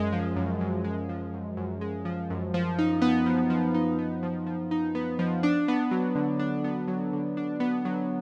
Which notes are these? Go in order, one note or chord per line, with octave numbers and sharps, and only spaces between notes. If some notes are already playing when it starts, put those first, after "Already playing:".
Already playing: F#2 G#3
F3
F#2
F#2
G#3
F3
F#2
F#2
G#3
F3
F#2
F3
D#4
B3
F3
F3
D#4
B3
F3
F3
D#4
B3
F3
D4
B3
F#3
D3
D4
B3
F#3
D3
D4
B3
F#3